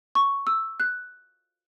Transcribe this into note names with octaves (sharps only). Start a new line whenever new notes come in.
C#6
E6
F#6